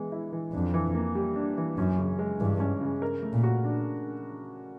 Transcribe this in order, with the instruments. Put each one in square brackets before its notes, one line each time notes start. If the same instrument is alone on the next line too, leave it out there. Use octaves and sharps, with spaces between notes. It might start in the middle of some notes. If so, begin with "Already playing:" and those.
Already playing: [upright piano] E3 G#3 B3
E4
E3
[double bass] F2 [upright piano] D4
[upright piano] E3
A#3
G3
D4
E3
[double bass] F#2 [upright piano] C#4
[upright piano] C#3
G#3
[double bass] G2 [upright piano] E3
[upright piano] C#4
C#3
A#4
A3
[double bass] A#2
[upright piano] F#4
D4